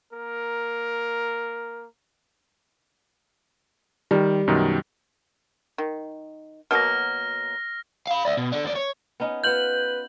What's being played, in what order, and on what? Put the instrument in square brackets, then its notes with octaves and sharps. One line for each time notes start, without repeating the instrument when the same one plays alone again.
[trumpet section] A#3 A#4
[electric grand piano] D#3 [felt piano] G3
[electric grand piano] F#2 B2 D#3
[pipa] D#3
[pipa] B2 F#3 A#3 [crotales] F6 A#6
[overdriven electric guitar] F5 B5
D5 E5
B2
D4 A4
D#2 D5
C#5
[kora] B3 C#4 D#4
[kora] B3 F4 [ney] B4 [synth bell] G6 F#7